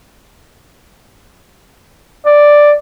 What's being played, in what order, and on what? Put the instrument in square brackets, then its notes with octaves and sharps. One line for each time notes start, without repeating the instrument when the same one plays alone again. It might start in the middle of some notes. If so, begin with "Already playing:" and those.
[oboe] D5